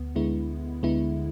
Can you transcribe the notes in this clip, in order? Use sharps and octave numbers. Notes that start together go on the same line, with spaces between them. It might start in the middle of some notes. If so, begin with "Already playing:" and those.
Already playing: D2 B3
D2 D3 G#3 B3 E4
D2 D3 G#3 B3 E4